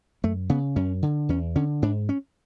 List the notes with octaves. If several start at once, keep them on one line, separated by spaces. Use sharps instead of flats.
F#2 A3
C#3 B3
F#2 C#4
D3
E2 C#4
D3 C#4
G#2 D4
C#4